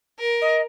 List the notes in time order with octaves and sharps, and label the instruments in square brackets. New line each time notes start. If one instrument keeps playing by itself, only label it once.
[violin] A#4
[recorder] D#5